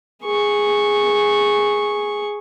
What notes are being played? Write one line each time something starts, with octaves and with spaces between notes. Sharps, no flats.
G#4 C#6